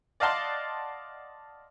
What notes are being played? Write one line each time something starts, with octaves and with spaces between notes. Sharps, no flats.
D5 D#5 F5 F#5 A5 C6